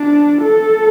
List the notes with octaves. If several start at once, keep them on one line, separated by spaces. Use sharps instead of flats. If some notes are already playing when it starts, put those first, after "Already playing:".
Already playing: D4
A4